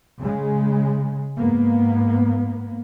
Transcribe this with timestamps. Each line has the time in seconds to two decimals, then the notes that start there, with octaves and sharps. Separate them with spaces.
0.20 C#3 G#3
1.38 G#2 A#3 B3